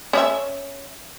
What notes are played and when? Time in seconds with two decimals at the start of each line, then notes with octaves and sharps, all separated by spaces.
0.13 C#4 D5 E5